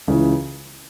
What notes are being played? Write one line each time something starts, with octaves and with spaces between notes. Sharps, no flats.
C#2 C#3 E3